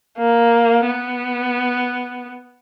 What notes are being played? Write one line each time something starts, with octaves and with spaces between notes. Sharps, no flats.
A#3
B3